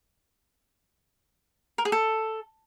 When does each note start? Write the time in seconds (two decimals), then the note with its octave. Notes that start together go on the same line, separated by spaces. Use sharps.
1.78 A#4
1.85 G#4
1.92 A4